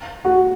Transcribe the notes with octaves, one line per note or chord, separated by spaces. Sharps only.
F#4